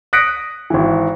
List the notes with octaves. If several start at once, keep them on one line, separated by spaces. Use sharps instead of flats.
D#6 F#6 A#6 B6 C#7 D7
G#1 E3